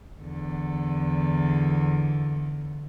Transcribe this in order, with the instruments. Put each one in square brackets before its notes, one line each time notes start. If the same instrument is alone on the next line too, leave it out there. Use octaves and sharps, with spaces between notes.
[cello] E2 D3